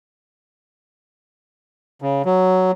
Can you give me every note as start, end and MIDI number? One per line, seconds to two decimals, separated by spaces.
2.02 2.22 49
2.25 2.71 54